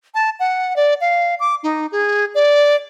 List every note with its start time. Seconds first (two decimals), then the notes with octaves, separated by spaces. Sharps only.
0.15 A5
0.40 F#5
0.76 D5
1.01 F5
1.40 D6
1.63 D#4
1.92 G#4
2.35 D5